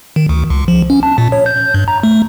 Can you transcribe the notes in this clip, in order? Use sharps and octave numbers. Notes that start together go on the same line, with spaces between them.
D#3
D2
C#2
F3
C#4
A5
A#2
C#5
G6
G2
A#5
A3